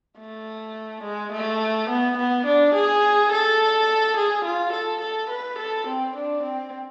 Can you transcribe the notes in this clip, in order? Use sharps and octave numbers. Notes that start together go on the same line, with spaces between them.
A3
G#3
A3
B3
B3
D4
G#4
A4
G#4
F4
A4
A4
B4
A4
C4
D4
C4